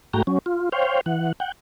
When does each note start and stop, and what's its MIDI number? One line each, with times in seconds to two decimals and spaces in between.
0.14 0.22 44
0.14 0.22 57
0.14 0.22 66
0.14 0.22 79
0.14 0.22 82
0.27 0.39 54
0.27 0.39 61
0.46 0.69 65
0.72 1.01 72
0.72 1.01 73
0.72 1.01 77
0.72 1.01 79
1.06 1.32 52
1.06 1.32 78
1.40 1.52 78
1.40 1.52 79